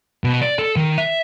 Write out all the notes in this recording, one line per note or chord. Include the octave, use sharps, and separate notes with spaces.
B2
D5
A4
D#3
E5